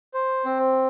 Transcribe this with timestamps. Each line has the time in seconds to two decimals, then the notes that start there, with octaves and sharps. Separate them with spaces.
0.14 C5
0.45 C4